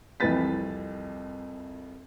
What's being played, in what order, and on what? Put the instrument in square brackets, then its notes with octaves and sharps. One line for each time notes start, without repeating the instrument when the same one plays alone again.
[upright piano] C2 F2 E3 B4 A6 B6